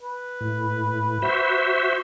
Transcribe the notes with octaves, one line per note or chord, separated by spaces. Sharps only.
B4
A2
F#4 C5 E5